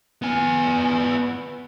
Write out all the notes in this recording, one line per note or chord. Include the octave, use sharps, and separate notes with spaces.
B3 G#5